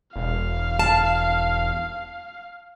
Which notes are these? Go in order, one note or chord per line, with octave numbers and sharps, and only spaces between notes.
E1 F5
A5